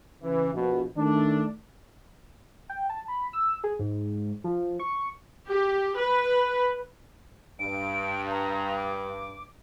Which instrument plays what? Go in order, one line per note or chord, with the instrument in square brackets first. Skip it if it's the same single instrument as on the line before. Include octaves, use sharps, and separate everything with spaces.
[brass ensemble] C#3 E3
A#1 B2
D#3 A3 D4
[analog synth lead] G5
A5
B5
E6
G#4
G#2
F3
C#6
[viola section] G4
B4
[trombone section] G2 [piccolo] D7
[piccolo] A#5
D6